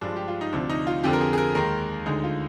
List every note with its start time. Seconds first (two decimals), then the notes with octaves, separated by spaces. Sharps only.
0.01 G2 F3 G#3 D4
0.16 G4
0.28 F4
0.41 D#4
0.53 D2 C3 F3 D4
0.69 D#4
0.87 F4
1.03 F2 D3 F3 G4
1.13 A#4
1.21 G#4
1.33 G#4
1.38 A#4
1.55 D#2 D#3 G#3 A#4
2.06 D2 D3 G#3 D#4
2.24 F4